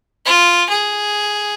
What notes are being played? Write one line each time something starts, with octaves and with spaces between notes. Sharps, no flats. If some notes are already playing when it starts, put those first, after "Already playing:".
F4
G#4